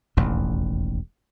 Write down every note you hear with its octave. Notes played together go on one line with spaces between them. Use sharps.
E1 A1 D#2